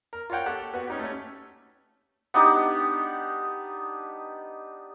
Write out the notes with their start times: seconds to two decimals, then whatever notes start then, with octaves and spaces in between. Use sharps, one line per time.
0.13 A#4
0.30 F4 A#4 C#5 F#5 G5
0.46 G4 A4 C#5 F#5
0.74 B3 F#4
0.87 C#4 D#4 G4
0.99 A3 C#4
2.34 B3 D4 D#4 G4